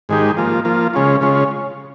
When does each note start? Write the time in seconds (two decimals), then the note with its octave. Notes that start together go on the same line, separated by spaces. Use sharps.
0.09 G#2 D#3 G#3 D#4 G4
0.37 F3 A#3 F4
0.65 F3 A#3 F4
0.94 C#3 G#3 C#4 F4
1.21 C#3 G#3 C#4 F4